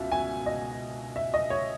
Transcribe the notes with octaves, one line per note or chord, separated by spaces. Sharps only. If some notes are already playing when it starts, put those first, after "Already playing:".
Already playing: C#2 B2 E5
G#5
D#5
E5
D#5
C#5